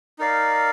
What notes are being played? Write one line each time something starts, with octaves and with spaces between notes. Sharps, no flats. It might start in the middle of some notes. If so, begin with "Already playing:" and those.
D#4 A#4 D5 F5